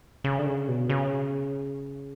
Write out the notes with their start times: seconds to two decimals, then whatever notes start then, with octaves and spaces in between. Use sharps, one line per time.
0.24 C#3
0.39 D3
0.46 C#3
0.68 B2
0.90 C#3